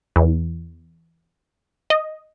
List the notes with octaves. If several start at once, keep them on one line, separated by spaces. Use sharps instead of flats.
E2
D#5